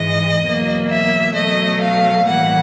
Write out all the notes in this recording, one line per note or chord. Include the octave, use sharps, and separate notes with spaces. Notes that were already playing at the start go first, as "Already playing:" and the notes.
Already playing: G#2 E3 G#3 D#5
E2 B2 F#3 A#3
E5
B2 F#3 A3 D#5
F5
A2 E3 G3 A#3 F#5